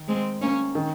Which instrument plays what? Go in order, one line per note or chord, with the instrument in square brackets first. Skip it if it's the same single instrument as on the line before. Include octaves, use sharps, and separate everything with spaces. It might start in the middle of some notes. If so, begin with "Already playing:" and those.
Already playing: [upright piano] D#3
[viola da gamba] G#3 C4
A#3 C#4
[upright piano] D#3